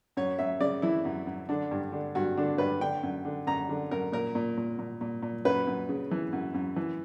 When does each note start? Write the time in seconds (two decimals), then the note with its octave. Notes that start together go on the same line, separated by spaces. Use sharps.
0.17 F#2 C#5
0.39 F#2 E5
0.60 C#3 D5
0.82 E3 E4
1.05 F#2
1.27 F#2
1.49 D3 D4
1.71 G2
1.92 D3
2.15 G2 F#4
2.37 D3 D4
2.58 G2 B4
2.81 D3 G5
3.03 F#2
3.25 D3
3.47 F#2 A#5
3.69 D3
3.91 F#2 A#4
4.12 A#2 A#4
4.35 A#2
4.57 A#2
4.79 A#2
5.01 A#2
5.22 A#2
5.45 F#2 B4
5.67 F#2
5.89 C#3
6.11 E3
6.33 F#2
6.54 F#2
6.76 E3